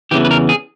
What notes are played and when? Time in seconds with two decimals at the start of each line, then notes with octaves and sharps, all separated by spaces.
0.11 E2 C#3 E3 G4
0.25 B4
0.31 A#4
0.49 G#4